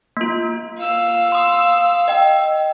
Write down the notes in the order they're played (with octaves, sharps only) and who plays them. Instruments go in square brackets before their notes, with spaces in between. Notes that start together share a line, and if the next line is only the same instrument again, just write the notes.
[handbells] A#3 F4
[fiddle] F5 E6
[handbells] C6 D#6
D#5 G5